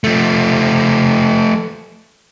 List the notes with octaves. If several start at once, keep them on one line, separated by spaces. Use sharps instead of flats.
F3 A3